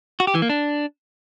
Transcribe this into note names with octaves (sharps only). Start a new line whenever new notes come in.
F#4
G4
E3
A#3
D4